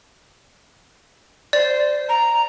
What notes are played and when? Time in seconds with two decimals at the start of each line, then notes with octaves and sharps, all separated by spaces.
1.53 C5 D5
2.08 A#5